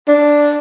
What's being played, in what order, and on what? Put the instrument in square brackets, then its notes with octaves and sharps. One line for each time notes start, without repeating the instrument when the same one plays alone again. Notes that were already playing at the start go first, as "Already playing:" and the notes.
[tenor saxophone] D4